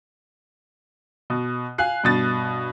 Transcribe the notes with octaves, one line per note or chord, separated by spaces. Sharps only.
B2
F5 G#5 F#6 C7
G2 B2 A6